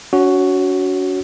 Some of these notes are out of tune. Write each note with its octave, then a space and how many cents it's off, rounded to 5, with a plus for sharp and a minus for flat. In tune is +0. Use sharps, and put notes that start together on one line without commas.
C#4 +45 F#4 +5 C#5 +0